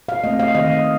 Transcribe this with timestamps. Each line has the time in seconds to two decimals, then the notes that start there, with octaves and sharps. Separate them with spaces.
0.09 F5
0.24 A3 C4 D#5
0.39 F5
0.55 D#3 D#5